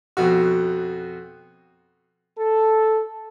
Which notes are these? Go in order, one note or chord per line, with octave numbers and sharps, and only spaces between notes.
F2 B2 F#4
A4